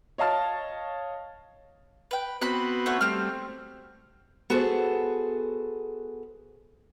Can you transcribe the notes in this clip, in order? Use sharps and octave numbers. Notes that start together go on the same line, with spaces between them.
C#5 D#5 F5 A5 F6 A6
B4 G5
B3 C4 F#4 B5 F#6
A3 C#5 F#5
G3 A3 C4 F6
B3 F#4 G#4 A4 C5